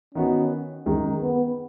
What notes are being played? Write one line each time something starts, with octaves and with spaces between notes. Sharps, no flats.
D#3 B3 C#4 F#4
F#2 D#3 G#3
B3